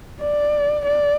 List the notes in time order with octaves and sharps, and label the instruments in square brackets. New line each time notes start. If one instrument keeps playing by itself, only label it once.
[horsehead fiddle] D5
D5